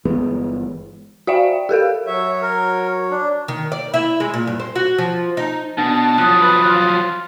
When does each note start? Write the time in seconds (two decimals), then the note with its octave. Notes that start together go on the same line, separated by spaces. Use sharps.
0.05 G1 E3 G#3 B3
1.27 F#4 D5 E5 F5 G5
1.69 G4 A4 A#4 F5
2.07 F#3 F#4 C#5 E5
2.42 A#4
3.11 D4
3.48 D#3
3.72 D5
3.94 E4
4.20 G#3
4.34 A#2
4.47 G2
4.60 C5
4.75 F#4
4.98 F3
5.37 D#4
5.78 B2 D4 A5
6.18 F3 F#3 D#6 F#6
6.41 B4
6.65 F4